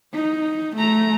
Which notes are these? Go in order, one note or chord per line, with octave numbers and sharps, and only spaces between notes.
D#4
A3 A#5